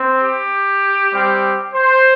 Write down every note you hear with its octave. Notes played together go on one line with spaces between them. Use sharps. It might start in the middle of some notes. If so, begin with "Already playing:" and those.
Already playing: C4
G4
G3 C4 G4
C5